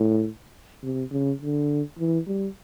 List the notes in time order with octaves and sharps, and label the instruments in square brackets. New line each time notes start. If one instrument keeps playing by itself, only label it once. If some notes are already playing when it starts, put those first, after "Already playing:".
Already playing: [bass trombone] A2
C3
C#3
D3
E3
G3